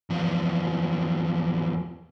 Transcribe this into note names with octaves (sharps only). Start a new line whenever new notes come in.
E2 F3